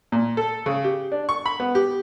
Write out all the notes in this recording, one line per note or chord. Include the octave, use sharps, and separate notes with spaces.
A#2
A4
C#3
G4
D4
C#6
B5
B3
G4